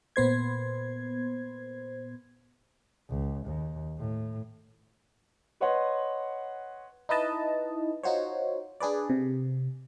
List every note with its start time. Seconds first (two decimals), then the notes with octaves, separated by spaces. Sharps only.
0.16 A#2 B3 C5 G#6
3.10 C#2
3.46 D#2
3.98 A2
5.61 B4 C#5 D#5 F#5 C6
7.09 D#4 E4 B4 D#5 A5
8.03 D#4 F4 F#4 C5 C#5
8.80 D4 G#4 B4 D5
9.10 C3